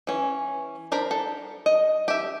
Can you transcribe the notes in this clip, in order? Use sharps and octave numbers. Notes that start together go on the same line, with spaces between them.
E3 C#4
D4 A#4 C5 B5
A4
D#5
G4 E5